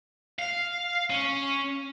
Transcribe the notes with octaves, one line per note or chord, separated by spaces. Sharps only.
F5
C#4